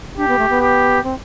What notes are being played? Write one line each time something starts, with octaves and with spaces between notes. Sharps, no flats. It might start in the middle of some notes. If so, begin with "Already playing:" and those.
D4 G4
B3
A3
B3
G4
C4